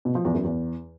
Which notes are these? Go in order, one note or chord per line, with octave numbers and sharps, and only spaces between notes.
B2
F3
E2
F#2
E2